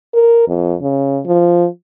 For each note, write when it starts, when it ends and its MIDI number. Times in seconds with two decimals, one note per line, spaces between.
0.14 0.44 70
0.48 0.74 41
0.81 1.20 49
1.26 1.66 53